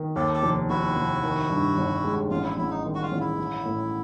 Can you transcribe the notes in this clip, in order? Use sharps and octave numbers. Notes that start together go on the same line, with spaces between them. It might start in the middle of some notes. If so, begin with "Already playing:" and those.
Already playing: D#3
D#2 G4 A4
G4 A4
F1
F1 E4 F#4
F1
D#3
G2
G1
G#3
A1 F4
E4
A1 E4
D#4
D#3
F#4
F4
A1
E4
E3
A2